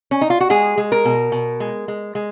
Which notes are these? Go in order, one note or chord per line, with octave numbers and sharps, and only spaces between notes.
C#4
D#4
F4
F#4
G#3 G#4
G#3
A#4
B2
B2
G#3
G#3
G#3